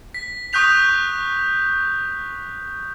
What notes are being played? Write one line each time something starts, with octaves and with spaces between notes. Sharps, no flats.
B6
C#6 D#6 F#6 G6 B6 F7